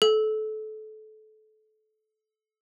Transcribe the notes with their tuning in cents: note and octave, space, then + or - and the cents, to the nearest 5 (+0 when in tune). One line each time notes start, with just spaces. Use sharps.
A4 -25